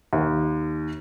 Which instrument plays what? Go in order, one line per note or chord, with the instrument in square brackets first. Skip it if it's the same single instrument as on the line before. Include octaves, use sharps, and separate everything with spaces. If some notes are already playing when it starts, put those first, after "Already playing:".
[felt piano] D#2